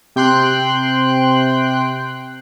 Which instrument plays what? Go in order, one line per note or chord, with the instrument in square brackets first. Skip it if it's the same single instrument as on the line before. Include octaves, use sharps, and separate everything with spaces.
[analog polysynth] C3 G5 C6 F#6